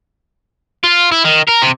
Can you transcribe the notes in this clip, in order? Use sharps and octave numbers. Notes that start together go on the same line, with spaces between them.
F4
E4
D#3
A#4
C3